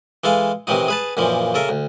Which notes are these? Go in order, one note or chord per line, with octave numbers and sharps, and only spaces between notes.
E3 G#3 A4 F5
C3 D#3 E3 F#3 D#4
G#4 B4 A5
F#2 A#2 E3 F3
C#3 A4 A#4 E5
D2